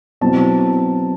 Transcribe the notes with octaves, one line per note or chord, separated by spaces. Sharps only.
B2 F#3 C4 E4 A5